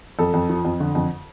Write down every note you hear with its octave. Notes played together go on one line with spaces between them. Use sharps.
F2 A4
F2
F3
F2
D3
F2